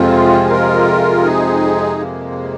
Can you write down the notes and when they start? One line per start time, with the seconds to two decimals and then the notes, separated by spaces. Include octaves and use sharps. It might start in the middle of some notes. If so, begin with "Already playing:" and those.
Already playing: F2 C3 G#3 C4 F4
0.45 G#4
0.50 F4 A#4
1.24 D#4 G#4
1.99 A#3